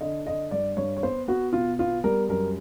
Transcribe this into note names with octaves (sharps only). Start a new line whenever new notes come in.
D3 D#5
D3 D#5
G2 D5
G2 C#5
C#5
B3 C5
B3 F#4
B2 F4
B3 F4
G3 A#4
F#2 A#4